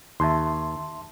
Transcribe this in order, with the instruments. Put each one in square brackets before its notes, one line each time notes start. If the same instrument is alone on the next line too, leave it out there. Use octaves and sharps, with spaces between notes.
[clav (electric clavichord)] D#2 [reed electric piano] E5 A5 C6